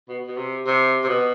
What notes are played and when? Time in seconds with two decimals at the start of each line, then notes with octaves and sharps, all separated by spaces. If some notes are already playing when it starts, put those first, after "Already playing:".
0.09 B2
0.27 B2
0.37 C3
0.66 C3
1.04 C3
1.08 B2